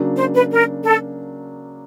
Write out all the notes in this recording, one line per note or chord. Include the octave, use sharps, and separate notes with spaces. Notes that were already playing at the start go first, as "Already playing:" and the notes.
Already playing: C#3 F#3 A#3 D4
C5
B4
A#4
A4